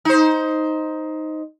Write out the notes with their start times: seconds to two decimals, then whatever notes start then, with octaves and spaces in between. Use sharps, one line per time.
0.05 D#4 C5